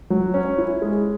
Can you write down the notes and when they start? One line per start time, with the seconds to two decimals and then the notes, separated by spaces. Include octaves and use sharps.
0.10 F#3
0.34 C#4
0.58 E4
0.82 G#3